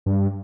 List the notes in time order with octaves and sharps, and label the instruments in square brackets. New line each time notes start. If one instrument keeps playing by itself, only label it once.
[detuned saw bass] G2